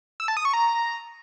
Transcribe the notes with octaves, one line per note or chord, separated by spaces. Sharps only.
E6
A5
D#6
C#6
A#5